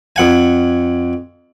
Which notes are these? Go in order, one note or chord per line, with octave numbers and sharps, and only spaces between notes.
F2 F#5 G#5